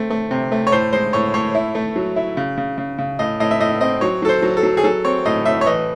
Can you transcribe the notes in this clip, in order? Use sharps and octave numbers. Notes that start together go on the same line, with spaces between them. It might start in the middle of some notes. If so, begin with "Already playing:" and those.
Already playing: A3 C4
A3
C3
A3
C#5
A2 C5
G#3 C5
A2 C#5
A2 C#5
E4
A3
F#3
E4
C#3
C#3
C#3
C#3
A2 D#5
A2 D#5
E5
A2 D#5
C4 D#5
F#3 C#5
F#3 A4
C5
F#3
A4
F#3
G#4
F#3 A4
C4 C#5
A2 D#5
A2 E5
C#5
E3 D#5